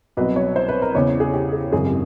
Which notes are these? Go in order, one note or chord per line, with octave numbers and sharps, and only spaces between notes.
C2 B2 F#3 B4
C#5
C5
B4
A#4
E2 C#3 E3 C#5
G#4
G4
G#4
G#1 F#2 C#3 E3 G#4
G4